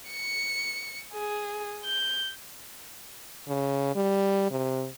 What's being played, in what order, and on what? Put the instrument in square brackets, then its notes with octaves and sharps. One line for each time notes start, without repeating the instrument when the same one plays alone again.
[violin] C#7
G#4
G6
[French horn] C#3
G3
C3